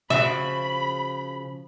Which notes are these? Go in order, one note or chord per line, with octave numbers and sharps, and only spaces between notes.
C#3 F3 F#4 E5 B5